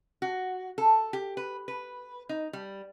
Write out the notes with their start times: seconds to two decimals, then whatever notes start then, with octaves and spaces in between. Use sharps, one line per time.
0.22 F#4
0.78 A4
1.13 G4
1.37 B4
1.68 B4
2.29 D#4
2.53 G3